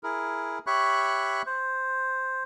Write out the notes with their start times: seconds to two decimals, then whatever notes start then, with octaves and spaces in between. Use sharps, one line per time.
0.03 E4 G#4 A#4
0.67 G4 C#5 E5 B5 C#6 F#6
1.46 C5